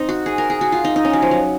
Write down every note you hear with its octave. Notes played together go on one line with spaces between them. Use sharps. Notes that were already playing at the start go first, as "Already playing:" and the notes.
Already playing: C4 D#4
F#4
G#4
A#4
G#4
F#4
F4
D#4
D#4
C#4
F#3
F3
F#3